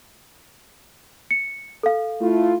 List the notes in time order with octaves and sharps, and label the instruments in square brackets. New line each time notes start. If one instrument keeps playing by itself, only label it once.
[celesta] C#7
A4 F5
[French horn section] A3 E4 F4